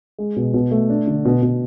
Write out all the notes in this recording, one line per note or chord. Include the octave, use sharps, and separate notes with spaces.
G#3
B2
B2
A3
D4
D3
B2
B2